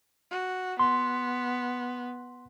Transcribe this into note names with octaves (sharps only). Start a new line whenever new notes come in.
F#4
B3 C6